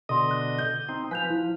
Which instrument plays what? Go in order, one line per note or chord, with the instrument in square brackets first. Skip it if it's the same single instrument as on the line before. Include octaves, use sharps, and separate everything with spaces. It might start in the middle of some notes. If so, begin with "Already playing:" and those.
[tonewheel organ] B2 D3 D#5 [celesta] C6 D#6
[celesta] F#6
G6 G7
[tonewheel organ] C4 D#4
[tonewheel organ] F3 B4 [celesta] G#5 G6 F7
[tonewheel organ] F3 [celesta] E4